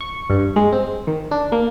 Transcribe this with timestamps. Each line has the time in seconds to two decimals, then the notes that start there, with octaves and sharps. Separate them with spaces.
0.01 C#6
0.30 G2
0.56 G#3
0.72 C4
1.07 D#3
1.31 D4
1.52 A#3